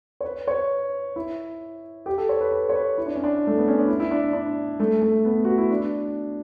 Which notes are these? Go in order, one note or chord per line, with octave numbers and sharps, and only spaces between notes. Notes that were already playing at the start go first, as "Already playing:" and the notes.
C#5
B4
C#5
E4
G4
A4
C#5
B4
B4
C#5
B4
E4
D4
C#4
D4
A3
B3
C#4
D4
E4
E4
D4
D4
A3
A3
B3
F#4
E4
D4